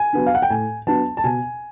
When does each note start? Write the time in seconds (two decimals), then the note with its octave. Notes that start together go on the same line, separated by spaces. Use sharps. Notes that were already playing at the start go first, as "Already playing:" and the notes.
Already playing: G#5
0.13 F#3 B3 D4
0.27 F5
0.35 F#5
0.42 G5
0.50 A2 G#5
0.87 F#3 B3 D4 A5
1.17 A5
1.24 B2 G#5